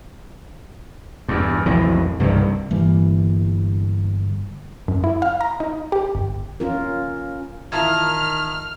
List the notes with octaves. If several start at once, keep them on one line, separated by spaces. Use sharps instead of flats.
E2 G2
B1 F2 A2 E3
C2 G2 C3 D#3
G1 E3 G3 A#3
F#2
E4
F5
A#5
D#4
G4
G1
C#4 F4 A#4
A1 D#3 E4 F4 A5 A#5 F6 G#6